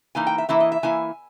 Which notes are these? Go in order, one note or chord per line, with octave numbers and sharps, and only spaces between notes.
E3 A#3 D#4 G#5
G5
E5
E3 A#3 E4 E5
D#5
E5
E3 A#3 E4 G#5